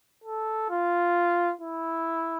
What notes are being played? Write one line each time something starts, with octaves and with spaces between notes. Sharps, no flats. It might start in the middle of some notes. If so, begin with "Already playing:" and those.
A4
F4
E4